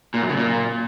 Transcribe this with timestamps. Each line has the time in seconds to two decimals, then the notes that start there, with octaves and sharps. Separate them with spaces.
0.14 A#2
0.22 F#2
0.29 C#3
0.37 A#2